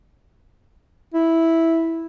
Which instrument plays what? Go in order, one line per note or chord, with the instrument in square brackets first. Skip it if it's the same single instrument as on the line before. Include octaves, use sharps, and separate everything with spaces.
[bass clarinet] E4